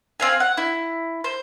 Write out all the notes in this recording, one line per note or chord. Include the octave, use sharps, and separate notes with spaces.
C4 F5 G#5
F#5
E4
C5